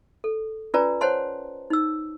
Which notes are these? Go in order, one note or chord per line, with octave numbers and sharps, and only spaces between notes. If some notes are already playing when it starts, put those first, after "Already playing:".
A4
C#4 F4 B4 D5 G#5 A#5
C5 C#5 F#5 A5 C6
D#4 E6